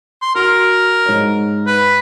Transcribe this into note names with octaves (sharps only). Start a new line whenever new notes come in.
C6
F#4 A#4
G#2 C#5
B4